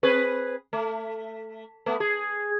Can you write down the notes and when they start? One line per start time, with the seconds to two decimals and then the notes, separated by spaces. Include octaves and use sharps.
0.03 C4 G#4 B4
0.73 A3
1.86 A3 B3
2.00 G#4